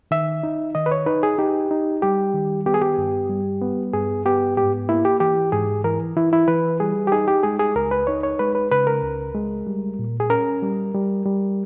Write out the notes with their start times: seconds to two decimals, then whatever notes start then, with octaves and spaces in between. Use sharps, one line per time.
0.11 D#3 E5
0.43 D#4
0.75 D#3 D#5
0.86 B4
0.91 C#5
1.06 D#4 B4
1.23 G#4
1.38 D#4 G4
1.71 D#4
2.02 G3 G4
2.34 D#3
2.66 B3 G4
2.74 G#4
2.82 G4
2.98 G2
3.29 G3
3.61 B3
3.93 G2 G#4
4.25 B3 G4
4.57 G#2 G4
4.89 A#3 E4
5.05 G4
5.20 E3 G4
5.52 G#2 G#4
5.84 E3 A#4
6.17 E3 E4
6.33 E4
6.48 E3 B4
6.80 G3 G#4
7.07 G4
7.12 D#4 G#4
7.28 G4
7.43 G#3 G#4
7.59 G#4
7.75 C#2 A#4
7.91 B4
8.07 D#4 C#5
8.23 C#5
8.39 G#3 B4
8.55 B4
8.71 C#3 B4
8.87 A#4
9.03 C#2
9.35 G#3
9.67 G3
9.99 A#2
10.20 G#4
10.30 C#4 A#4
10.62 G3
10.95 G3
11.26 G3